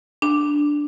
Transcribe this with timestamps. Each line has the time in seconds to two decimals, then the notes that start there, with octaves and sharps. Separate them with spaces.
0.22 D4